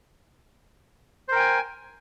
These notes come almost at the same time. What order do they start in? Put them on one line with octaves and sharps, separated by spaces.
C5 A#4 G5 G#5